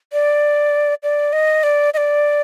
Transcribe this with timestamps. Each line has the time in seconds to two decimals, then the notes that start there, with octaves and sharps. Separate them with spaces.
0.13 D5
1.03 D5
1.33 D#5
1.63 D5
1.94 D#5
1.97 D5